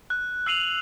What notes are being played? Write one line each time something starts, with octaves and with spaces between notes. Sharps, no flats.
F#6
E6 F#6 C7 D#7 F7 F#7